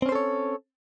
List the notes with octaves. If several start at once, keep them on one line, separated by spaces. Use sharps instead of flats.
C4 C#4 A4 C5 C#5